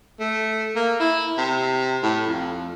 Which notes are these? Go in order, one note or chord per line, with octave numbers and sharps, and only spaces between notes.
A3
A#3
E4
C3
A2
F2